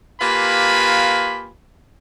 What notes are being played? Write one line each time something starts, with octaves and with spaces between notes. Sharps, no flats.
A#3 F4 G4 B4 G#5 B5